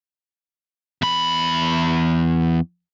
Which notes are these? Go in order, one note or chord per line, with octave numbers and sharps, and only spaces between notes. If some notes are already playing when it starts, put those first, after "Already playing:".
E2 B5